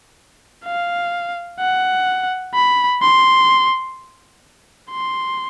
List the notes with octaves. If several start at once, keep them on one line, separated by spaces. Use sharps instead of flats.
F5
F#5
B5
C6
C6